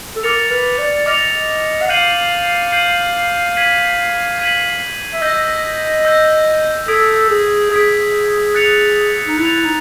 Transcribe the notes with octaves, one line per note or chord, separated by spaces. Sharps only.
A4
A#4 D6 F6 A6 C#7 F7
B4
D5
D#5 D6 F6 A6 C#7 F7
F#5
F5 G6 C7 D#7 F#7
G6 C7 D#7 F#7
G#6 B6 D#7 F#7
G#6 B6 D#7 F#7
E5
D#5 E6 G6 A#6
E6 G6 A#6
A4 D#6 G#6 B6 D7
G#4
G#4 D#6 G#6 B6 D7
F#6 A6 C#7 F7
D#4
E4 F#6 A6 C#7 F7
D#4